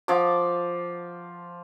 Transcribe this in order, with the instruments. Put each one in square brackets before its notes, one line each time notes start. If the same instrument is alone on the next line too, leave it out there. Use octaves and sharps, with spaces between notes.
[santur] F3 D6